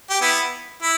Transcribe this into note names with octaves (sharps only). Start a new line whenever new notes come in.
G4
B3 E4
E4